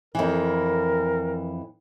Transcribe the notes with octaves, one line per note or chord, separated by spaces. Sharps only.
F2 E3 A#4